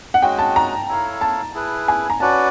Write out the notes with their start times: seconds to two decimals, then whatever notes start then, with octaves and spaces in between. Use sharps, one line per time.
0.14 F#5
0.22 G#3 C#4 F#4 G5
0.39 A5
0.56 A#5
0.89 E4 A4 C#5 F5
1.21 A5
1.55 E4 G#4 B4
1.88 G#5
2.10 A#5
2.20 C#4 F#4 B4 D5 A5